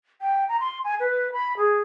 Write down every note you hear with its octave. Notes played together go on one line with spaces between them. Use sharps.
G5
A#5
C6
G#5
B4
B5
G#4